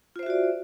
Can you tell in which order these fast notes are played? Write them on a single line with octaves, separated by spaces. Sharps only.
F4 C5 E5 F#4 D5